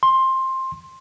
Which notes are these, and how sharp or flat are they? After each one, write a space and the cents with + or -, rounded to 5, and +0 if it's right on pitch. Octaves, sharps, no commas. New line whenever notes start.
C6 +15